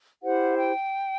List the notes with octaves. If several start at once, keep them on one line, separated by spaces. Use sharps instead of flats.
E4 G4 C5 F#5
G5